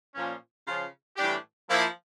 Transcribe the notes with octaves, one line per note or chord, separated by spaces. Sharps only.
A#2 F3 C#4
C#3 F3 C#4 F4
A2 E3 G3 D4 G4
F3 A#3 E4